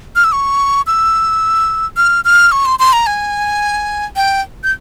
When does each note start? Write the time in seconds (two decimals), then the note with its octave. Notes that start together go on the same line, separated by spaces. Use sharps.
0.16 F6
0.24 E6
0.32 C#6
0.87 E6
1.97 F6
2.25 F6
2.52 C#6
2.66 C6
2.79 C6
2.93 A#5
3.07 G#5
4.16 G5
4.64 G6